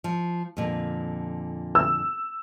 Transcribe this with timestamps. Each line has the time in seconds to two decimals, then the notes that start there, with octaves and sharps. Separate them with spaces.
0.04 F3
0.57 F2 A#2 D3
1.75 E6